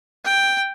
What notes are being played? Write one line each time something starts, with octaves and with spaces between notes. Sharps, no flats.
G5